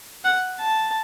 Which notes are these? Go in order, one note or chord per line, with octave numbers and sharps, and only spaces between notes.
F#5
A5